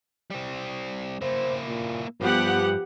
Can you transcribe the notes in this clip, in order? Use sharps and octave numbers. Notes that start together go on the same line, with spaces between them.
G3 C4
A#3 E4 C5
A#2
G2 F3 B3 G4 F#5